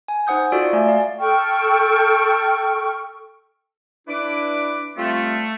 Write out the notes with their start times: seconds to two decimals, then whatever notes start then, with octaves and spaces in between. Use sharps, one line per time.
0.08 G#5
0.27 D#4 C5 F#5 D#6 G6
0.52 F4 F#4 A4 D5 E6 D7
0.73 A3 D5 G#5
0.86 D5 F5
1.20 A4 G5 C#6 F6
4.08 D4 E4 B4 D6
4.97 G3 A3 C4 F4